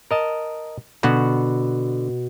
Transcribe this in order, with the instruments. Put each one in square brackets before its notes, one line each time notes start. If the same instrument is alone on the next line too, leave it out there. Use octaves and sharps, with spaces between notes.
[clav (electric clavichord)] A#4 D#5 A5
[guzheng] B2 [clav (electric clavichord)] D3 F#5